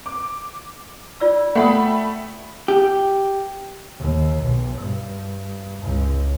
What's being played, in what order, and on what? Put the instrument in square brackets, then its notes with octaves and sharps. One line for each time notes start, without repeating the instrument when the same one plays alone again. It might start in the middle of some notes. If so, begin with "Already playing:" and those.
[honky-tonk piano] D6
[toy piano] F4 D5 E6
[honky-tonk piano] A3 B5 [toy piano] F#5 G5 D#6
[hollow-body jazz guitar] G4
[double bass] D#2
B1
G2
C#2